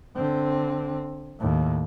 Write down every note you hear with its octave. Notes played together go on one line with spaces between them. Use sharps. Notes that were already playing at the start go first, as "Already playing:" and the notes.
D3 C4
D#2 A2